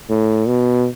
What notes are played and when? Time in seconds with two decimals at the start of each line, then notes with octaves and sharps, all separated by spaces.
0.10 A2
0.48 B2